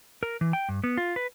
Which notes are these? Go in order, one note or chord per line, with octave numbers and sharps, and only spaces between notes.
A#4
E3
G5
G2
B3
F4
B4